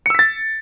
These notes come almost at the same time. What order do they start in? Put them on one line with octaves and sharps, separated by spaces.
C#7 E6 B6 A6